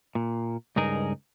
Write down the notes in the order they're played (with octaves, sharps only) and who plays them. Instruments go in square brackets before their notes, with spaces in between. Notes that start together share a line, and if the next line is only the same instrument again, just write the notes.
[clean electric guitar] A#2
C#2 G2 D#4 G#4 A#4